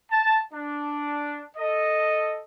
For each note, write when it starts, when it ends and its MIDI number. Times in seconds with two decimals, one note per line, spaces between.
0.11 0.39 81
0.54 1.45 62
1.57 2.42 69
1.57 2.42 75